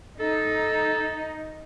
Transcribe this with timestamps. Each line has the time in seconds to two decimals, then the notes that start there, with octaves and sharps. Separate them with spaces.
0.20 D#4 A4